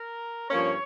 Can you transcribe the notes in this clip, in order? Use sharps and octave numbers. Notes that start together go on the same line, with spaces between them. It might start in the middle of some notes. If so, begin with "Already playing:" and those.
Already playing: A#4
G2 F3 A#3 C#4 C#5